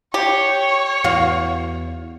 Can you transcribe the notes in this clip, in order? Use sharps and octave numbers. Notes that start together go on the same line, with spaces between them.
G4 C#5
E2 F#4 F5